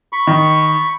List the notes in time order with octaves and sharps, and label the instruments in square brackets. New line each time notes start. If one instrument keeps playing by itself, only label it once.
[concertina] B5 C#6
[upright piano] D#3